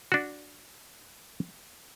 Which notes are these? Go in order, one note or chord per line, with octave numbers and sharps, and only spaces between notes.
D4 F#4